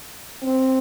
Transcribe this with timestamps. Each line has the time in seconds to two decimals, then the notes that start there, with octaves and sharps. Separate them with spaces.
0.43 C4